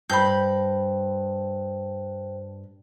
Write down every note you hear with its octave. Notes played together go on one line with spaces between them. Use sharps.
G2 C5 G5 A5 B5 G6